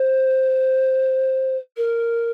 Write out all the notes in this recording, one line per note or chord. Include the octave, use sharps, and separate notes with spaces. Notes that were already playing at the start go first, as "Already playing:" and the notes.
Already playing: C5
A#4